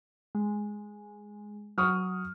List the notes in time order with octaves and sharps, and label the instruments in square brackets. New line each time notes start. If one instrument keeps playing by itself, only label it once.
[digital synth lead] G#3
[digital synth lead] F#3 [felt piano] C#6 D#6 F6